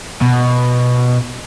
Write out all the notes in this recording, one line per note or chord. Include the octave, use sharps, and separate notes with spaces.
B2